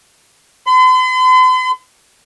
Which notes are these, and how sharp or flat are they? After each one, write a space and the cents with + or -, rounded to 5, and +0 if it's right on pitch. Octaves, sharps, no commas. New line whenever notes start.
C6 -45